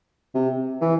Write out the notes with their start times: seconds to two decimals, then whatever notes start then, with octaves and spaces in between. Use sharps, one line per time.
0.34 C3
0.81 E3